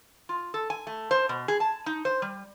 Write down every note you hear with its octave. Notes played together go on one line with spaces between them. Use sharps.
F4
A4
G#5
A3
C5
B2
G#4
A5
D#4
C5
G3